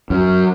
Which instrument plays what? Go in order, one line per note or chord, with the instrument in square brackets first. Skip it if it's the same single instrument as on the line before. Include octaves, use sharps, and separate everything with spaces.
[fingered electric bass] F#2